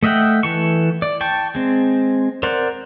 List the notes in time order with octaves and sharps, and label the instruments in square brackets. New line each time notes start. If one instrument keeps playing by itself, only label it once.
[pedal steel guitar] A3 D#5 E5 F#5 G5
E3 A4 C#6
D5
G5 A5 C#6
G#3 C4
A#4 C5 D5 F#5